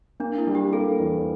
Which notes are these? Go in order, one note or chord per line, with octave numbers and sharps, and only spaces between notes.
A#3 D4
E4
G3
G4
A#3 A4
E2